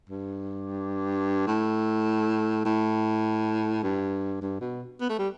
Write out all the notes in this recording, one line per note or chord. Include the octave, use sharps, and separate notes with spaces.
G2
A2
A2
G2
G2
B2
B3
A3
G3